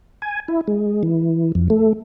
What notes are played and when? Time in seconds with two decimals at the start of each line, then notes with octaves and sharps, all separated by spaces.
0.22 G#5
0.48 E4
0.68 G#3
1.03 E3
1.55 F2
1.70 A3